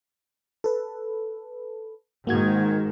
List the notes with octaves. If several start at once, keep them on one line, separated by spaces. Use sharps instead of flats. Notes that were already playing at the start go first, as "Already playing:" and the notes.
A4 B4
G#2 D#3 A#3 F#4 G#6